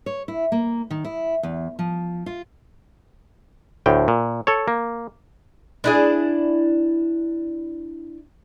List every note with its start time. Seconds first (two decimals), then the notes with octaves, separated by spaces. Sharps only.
0.06 C#5
0.28 E4
0.52 A#3
0.90 D#3
1.05 E4
1.43 E2
1.79 F3
2.26 F4
3.86 D2 A2 G5
4.08 A#2
4.47 A4 C#5
4.68 A#3
5.84 D4 E4 G#4